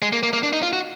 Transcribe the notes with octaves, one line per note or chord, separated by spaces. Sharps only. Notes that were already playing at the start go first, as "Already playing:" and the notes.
G#3
A#3
A#3
A#3
D4
D#4
F4
F#4